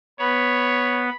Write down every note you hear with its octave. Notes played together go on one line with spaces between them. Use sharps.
B3 C#5 B5